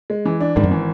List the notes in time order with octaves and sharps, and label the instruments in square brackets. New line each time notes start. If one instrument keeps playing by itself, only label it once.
[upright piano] G#3
E3
D4
[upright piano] G#1 [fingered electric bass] G#2
[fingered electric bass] F#2
[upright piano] E3